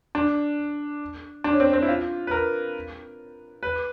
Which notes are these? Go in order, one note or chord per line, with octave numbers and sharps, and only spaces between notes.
D4
D4
C#4
C4
C4
E4
F4
B4
A#4
B4